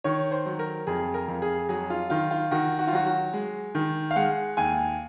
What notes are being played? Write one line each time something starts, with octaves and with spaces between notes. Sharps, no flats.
D#3 C#5
C5
F#3
A#4
F2 G#4
A#4
F2
G#4
F#3 G#4
F4
D#3 F4
F4
D#3 F#4
F#4
F4
F#3 F#4
F#4
G#3
D#3
F5
G#3 F#5
D#2 G#5